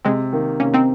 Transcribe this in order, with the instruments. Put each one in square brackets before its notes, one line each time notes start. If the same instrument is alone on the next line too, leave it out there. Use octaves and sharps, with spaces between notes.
[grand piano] C3 [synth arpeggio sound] G#3 C4
[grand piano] D#3 A#3
[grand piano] C3 [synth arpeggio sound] A#3 C#4
[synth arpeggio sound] C4 D#4